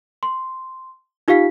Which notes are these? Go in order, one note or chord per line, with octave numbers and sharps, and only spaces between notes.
C6
D#4 F4 G4 F5 B6